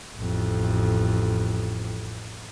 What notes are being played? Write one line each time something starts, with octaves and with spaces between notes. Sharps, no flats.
A1 F2